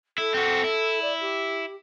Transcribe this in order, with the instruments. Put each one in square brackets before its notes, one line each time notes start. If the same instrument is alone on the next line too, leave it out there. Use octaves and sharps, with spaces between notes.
[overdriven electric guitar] E4 [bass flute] A4
[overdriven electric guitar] C4 F#4
E4
[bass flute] D5
G4